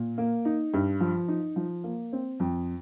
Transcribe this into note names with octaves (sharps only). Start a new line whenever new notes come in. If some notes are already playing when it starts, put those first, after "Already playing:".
Already playing: A#2
A#3
D#4
G2
F3
D#4
F3
A#3
C4
F2